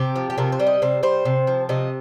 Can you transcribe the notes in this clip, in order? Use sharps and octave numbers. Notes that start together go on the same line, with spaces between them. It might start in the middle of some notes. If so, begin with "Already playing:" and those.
Already playing: C3 G4
F3
G4
C3 A#4
C5
G3
D#5
C3 C5
G3 C5
C3
F3
C3 D#5